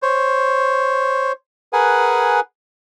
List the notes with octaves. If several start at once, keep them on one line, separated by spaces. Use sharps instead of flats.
C5 C#5
G#4 A#4 B4 F#5 G#5